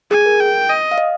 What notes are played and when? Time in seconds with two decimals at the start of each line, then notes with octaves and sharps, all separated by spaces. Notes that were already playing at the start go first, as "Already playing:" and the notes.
0.11 G#4 G#5
0.26 A#4
0.40 G5
0.69 D#5
0.91 F5
0.98 D#5